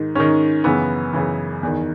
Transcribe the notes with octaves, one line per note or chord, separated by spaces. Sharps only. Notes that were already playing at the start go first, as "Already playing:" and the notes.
Already playing: G#2 D#3
G#2 D#3 C#4
F#2 C#3 E3 B3
F#2 C#3 E3
E2 D#3